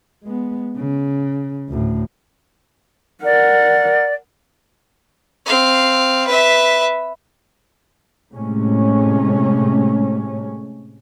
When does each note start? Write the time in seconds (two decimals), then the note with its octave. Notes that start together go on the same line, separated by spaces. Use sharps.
0.24 G#3 B3
0.77 C#3
1.69 D2 A2
3.24 A#4 D5 F#5
5.46 C4 F5
6.27 B4 E5
8.33 A2 C3 G#3 A3 C#4